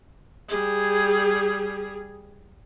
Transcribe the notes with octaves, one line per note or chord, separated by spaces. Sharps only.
G3 G#4